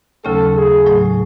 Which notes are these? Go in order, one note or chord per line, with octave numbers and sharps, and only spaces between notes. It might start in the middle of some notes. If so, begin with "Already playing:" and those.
D#2 C#3 F#3 A3 C#4 A4
G#4
A2 F#3 A3